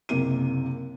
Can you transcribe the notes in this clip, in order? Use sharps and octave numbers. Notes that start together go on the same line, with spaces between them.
F#1 C3 A#3 D#7